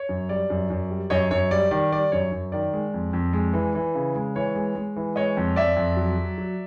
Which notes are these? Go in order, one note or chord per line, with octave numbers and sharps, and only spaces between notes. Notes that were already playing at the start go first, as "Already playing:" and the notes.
Already playing: C#5
F#2
G3 D5
F#2
F#2
G3
F#2 C#5 D#5
F#2 C#5
G3 D5
D#3 D5
G3 D5
F#2 C#5
F#2
D#3 D5
G#3
F2
F2
G#3
E3
E3
C#3
G#3
E3 C#5
G#3
G#3
E3
G#3 C#5 D#5
F2
F2 D5 E5
F2
F#3
F#3
F#3